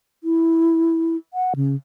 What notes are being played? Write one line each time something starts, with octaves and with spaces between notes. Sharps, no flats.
E4
F#5
C#3